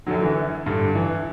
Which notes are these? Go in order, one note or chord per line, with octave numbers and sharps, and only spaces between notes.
F#2 D3 F#3
E3
G2 D3
E3